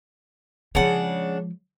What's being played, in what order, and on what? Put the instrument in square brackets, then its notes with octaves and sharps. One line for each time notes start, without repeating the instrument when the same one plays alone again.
[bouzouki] C#3 D4 F#5 [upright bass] F3 G#3